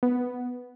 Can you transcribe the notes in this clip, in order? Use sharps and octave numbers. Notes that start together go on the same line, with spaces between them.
B3